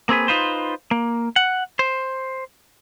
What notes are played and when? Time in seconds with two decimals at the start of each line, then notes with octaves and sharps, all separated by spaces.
0.09 A#3 C4 G#4 B4
0.28 D#4 F4 B4 C5
0.91 A#3
1.36 F#5
1.79 C5